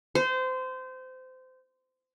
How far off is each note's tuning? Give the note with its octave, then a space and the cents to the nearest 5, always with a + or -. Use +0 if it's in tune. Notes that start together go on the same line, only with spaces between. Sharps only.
C5 -25